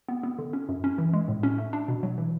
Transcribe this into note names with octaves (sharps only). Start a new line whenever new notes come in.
B3
B3
D3
C#4
F#2
C#4
E3
G#3
A2
C#4
A3
D4
B2
F#3
E3